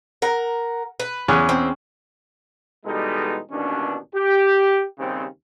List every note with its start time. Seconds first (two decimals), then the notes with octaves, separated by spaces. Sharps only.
0.22 A#4 F#5
1.00 B4
1.28 E2 C#4 G#4 F#6
1.49 C4
2.86 E2 B2 G3 G#3 D#4 A4
3.52 A1 D#2 B2 C#4 D4
4.16 G4
4.98 D#2 C#3 G3 C4